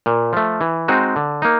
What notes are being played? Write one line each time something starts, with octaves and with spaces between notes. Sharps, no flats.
A#2
F3 A3
E3
G#3 C4 D#4 F#4
D3
A#3 D#4